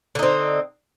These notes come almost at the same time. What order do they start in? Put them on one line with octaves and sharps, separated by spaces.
D3 D#4 C4